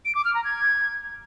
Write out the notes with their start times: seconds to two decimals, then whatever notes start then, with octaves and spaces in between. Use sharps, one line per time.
0.05 D7
0.15 D6
0.25 F6
0.35 A#5
0.44 G#6